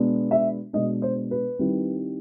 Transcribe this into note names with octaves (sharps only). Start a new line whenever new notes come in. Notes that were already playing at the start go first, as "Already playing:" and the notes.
Already playing: B2 G#3 B3 D4
E5
B2 G#3 B3 D4 D#5
C5
B4
D#3 G3 C4 E4